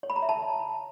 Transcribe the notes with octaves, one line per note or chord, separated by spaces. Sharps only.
C#5
B5
A#5
E5
A5